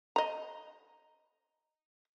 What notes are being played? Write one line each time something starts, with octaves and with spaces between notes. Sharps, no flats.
D#5 A#5